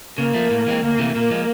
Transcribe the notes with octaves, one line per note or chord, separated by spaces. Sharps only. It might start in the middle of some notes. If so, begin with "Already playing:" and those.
C#3 A#3
F3 A3
A2
E3 G#3 C4
D2 A#3
C3 E3 A3
A#2 A#3
F3 G#3